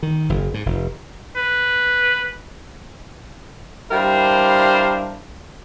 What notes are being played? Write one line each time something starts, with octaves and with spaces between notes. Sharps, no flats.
D#3
F#1
G#2
F1
B4
G3 D4 E4 A#4 C5 F5